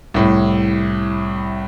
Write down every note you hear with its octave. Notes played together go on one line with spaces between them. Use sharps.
C2 A2